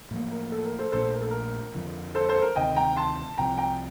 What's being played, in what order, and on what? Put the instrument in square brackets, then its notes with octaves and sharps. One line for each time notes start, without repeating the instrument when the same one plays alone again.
[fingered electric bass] A2 F3 A#3
[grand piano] A#4
A4
A#4
A4 C5
[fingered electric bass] A#1 A#2 A3 D4 [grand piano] A4 C5
[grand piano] A#4
A4
A#4
[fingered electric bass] F2 D3 F3
[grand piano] A4 C5
A4 C5
A#4
[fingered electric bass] D2 C3 D#3 [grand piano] D#5 G5
[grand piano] G5 A#5
A5 C6
[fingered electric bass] C2 C3 F3 [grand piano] G5 A#5
[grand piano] G5 A#5